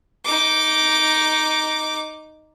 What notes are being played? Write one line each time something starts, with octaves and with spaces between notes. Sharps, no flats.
D#4 D6